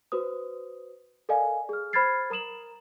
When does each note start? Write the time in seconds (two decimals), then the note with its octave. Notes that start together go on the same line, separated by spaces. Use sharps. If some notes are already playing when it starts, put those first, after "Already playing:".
0.12 F#4 B4 C5 D#6
1.29 A4 A#4 D5 D#5 F5 G#5
1.69 G#4 F6
1.93 C5 B5 F6 G#6 A6 C7
2.30 A#4 A#5 D#6 E7 F#7